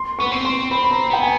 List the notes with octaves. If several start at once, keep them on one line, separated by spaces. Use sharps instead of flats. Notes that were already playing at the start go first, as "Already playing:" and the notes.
Already playing: C6
B3 C#6
C4
C6
C4 B5
B5
A#5
B3 G5
G#5